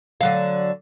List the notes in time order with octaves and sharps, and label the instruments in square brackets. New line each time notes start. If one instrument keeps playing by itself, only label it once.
[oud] D3 F#3 F5